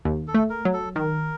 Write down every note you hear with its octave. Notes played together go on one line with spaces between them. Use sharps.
D#2
A4
A3
A#4
F#3
A4
D#3 A#4